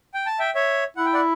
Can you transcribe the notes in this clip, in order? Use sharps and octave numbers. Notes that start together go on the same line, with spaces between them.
G5
A5
E5 G5
C#5 E5
E4 F#5
G5
D5 F#5